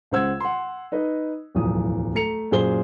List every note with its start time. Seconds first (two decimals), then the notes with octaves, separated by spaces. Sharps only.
0.11 C#2 C#3 C5 F#5 E6 G#6
0.40 F#5 C6
0.92 D#4 B4 D#5
1.55 D1 B1 E2 F3 D#6
2.15 A3 A#5 C#7 F7
2.51 F#2 A#2 G#4 C5 G7